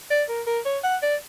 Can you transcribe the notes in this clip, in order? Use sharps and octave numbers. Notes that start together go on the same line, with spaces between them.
D5
A#4
A#4
C#5
F#5
D5